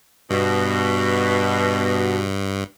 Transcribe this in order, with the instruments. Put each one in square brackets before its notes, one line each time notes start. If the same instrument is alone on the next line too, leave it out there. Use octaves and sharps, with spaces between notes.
[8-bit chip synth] G2 [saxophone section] B2